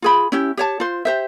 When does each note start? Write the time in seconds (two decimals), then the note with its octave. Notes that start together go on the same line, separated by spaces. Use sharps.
0.02 F4 G#4 B5
0.32 C#4 E4 G4
0.57 G4 C#5 A5
0.80 F4 C5
1.05 G4 C5 E5